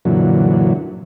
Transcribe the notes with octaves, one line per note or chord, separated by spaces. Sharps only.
F#2 A#2 D3 E3 F#3